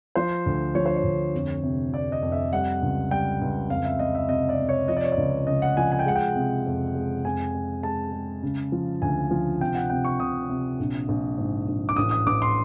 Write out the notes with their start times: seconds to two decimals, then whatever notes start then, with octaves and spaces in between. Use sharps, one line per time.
0.15 F3 C5
0.46 D2
0.75 F3 C#5
0.86 C5
0.96 C#5
1.04 D2
1.34 F2
1.63 C3
1.92 F2 D5
2.12 D#5
2.22 F2
2.32 E5
2.53 G3 F#5
2.82 C#2
3.11 G3 G5
3.41 C#2
3.70 F2 F5
3.85 E5
3.99 F2 D#5
4.15 E5
4.29 C3 D#5
4.49 D5
4.59 C3
4.69 C#5
4.88 F3 D#5
4.97 D5
5.04 C#5
5.12 D5
5.17 C#2
5.47 C#3 D#5
5.62 F#5
5.77 F3 G#5
5.92 G#5
5.99 G5
6.06 G#3 F#5
6.16 G5
6.35 C3
6.66 F2
6.95 G#3
7.24 F2 G#5
7.55 G#3
7.83 G#3 A5
8.13 G#3
8.43 C#3
8.72 F3
9.02 D2 G#5
9.31 F3
9.60 C3 G5
9.75 F#5
9.90 C3 G5
10.05 C#6
10.20 C3 D#6
10.49 C3
10.79 A#1
11.08 A#1
11.38 G#2
11.68 A#1
11.89 D6
11.96 A1 D#6
12.11 D#6
12.26 A1 D6
12.42 C6